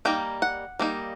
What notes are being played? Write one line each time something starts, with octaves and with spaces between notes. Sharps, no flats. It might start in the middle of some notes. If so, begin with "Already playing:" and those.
G3 A#3 D#4 G5
F#5
G3 A#3 D#4